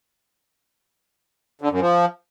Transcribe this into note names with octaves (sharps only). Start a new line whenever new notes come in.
D3
F#2
F3